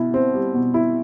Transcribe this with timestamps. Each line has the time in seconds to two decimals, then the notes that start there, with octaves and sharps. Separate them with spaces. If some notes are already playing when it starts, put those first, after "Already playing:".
Already playing: B2 E4
0.14 C4
0.34 G3
0.54 B2
0.74 E4